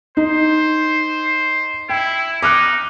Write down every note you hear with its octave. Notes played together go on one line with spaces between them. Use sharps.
D#4 C5
E4 G5
D#4 D6 F6 F#6